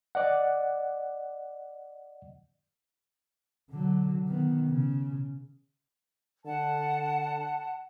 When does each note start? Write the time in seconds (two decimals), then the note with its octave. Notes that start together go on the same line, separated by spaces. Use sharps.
0.15 D5 D#5 F#5
3.71 D3 F#3
4.27 D#3 B3
4.67 C#3
6.45 D3 F#5 A5